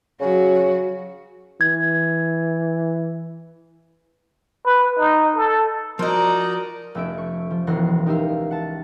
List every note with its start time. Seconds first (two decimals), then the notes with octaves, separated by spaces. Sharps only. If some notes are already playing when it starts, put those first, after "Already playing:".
0.20 C#3 F#3 F#4
1.61 E3 G#6
4.66 B4
4.99 D#4
5.36 A4
5.99 F3 D#4 F#4 A#4 D5 D#5
6.95 F1 A3 C#4 E5 D7
7.18 C#6
7.51 F3
7.67 E1 C#2 E3 F#5 C6 A#6
8.06 D#4 G4 A#4 E5 F5
8.51 F#5 A5